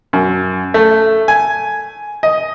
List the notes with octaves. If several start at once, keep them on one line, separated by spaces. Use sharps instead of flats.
F#2
A3
G#5
D#5